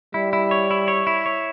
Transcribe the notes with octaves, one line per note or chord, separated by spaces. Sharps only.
G3 E4
E4
C#5
E4
C#5
E4
C#5